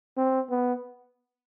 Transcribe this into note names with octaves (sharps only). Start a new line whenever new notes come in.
C4
B3